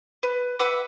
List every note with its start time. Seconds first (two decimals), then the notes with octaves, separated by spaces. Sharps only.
0.23 B4
0.59 B4 E5 F#5 D6